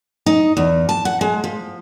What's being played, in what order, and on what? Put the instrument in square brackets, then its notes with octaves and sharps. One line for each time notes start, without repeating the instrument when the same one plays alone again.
[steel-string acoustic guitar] D#4
E2
A5
F#5
G#3
F3